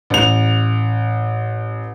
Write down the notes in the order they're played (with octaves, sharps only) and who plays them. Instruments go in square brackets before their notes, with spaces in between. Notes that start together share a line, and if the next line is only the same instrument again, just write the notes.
[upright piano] A1 F7